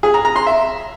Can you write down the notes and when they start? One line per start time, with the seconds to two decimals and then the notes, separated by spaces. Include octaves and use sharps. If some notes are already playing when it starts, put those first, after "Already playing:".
0.03 G#4
0.14 A#5
0.25 A#5
0.36 C6
0.46 E5